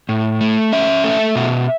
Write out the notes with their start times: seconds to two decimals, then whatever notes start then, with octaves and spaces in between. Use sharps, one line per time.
0.09 A2
0.41 A3
0.73 C#4 E5
1.04 A3
1.36 B2